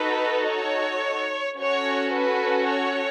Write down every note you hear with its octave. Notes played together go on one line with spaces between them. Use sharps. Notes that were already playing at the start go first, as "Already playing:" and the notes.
Already playing: D#4 F#4 A4 B4
C#5
C#4 F#4 A4 C#5
B4
C#5